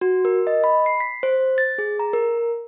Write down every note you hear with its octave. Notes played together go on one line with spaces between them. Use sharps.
F#4
A#4
D#5
B5
C7
B6
C5
A6
G#4
A#5
A#4